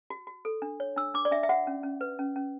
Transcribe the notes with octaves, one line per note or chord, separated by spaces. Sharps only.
F#4
F#4
A4
D4
C#5
D4 E6
D4 D6
D5
D4 E5
E5
F#4 F#5
C#4
C#4
B4
C#4
C#4